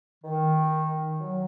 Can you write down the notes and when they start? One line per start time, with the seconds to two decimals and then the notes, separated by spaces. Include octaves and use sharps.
0.24 D#3
1.21 F#3